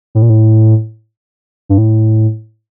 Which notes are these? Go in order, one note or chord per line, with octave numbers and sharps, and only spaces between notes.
A2
A#2
A2
G2
A2